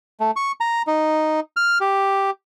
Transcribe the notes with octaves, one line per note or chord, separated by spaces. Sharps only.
A3
C#6
A#5
D#4
F6
G4